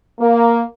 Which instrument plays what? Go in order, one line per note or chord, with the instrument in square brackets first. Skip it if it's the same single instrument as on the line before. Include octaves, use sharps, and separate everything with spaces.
[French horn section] A#3